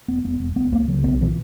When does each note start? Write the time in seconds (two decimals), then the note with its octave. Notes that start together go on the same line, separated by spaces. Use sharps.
0.08 E1 B3
0.24 E1 B3
0.40 E1
0.56 C#2 B3
0.72 C#2 A#3
0.88 C#3 F#3
1.04 B1 B3
1.21 A#2 E3